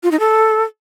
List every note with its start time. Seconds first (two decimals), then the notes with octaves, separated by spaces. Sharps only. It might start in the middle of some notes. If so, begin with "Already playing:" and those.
0.03 F4
0.11 D#4
0.20 A4